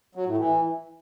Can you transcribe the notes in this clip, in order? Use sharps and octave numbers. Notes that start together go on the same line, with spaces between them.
F#3
A2
E3